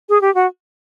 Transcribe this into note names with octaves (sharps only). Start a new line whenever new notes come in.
G#4
G4
F#4